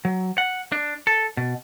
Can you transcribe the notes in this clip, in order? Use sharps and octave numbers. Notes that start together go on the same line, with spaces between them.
F#3
F#5
D4
A4
B2